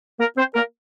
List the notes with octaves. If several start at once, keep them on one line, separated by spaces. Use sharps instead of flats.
A#3 A#4
C4 C5
A#3 A#4